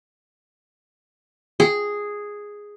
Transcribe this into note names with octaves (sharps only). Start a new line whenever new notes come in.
G#4